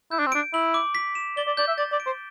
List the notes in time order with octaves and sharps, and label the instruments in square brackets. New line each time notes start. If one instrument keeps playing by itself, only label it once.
[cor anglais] E4 [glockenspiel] G6
[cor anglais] D4
C4
[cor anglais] D4 [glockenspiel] D7
[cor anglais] E4 [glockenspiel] F#7
[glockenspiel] D6
B6
E7
[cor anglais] D5 [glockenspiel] G7
[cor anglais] D5
[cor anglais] D5 [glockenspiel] G6
[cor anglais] E5
[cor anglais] D5 [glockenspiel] A6
[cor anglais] D5
[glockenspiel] D7
[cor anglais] C5